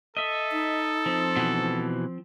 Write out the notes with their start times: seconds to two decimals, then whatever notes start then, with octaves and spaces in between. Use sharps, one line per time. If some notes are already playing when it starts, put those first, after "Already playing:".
0.17 A4 D#5 E5
0.52 D#4
1.06 F3 C4
1.36 B2 E3